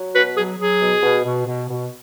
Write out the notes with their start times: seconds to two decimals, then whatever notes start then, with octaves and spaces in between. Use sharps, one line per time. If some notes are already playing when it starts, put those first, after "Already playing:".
Already playing: F#3
0.14 B2 F#4 B4
0.36 F#3 G#4
0.59 F#3 G#4
0.81 B2
1.02 B2
1.24 B2
1.46 B2
1.69 B2